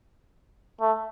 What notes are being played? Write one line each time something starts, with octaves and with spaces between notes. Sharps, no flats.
A3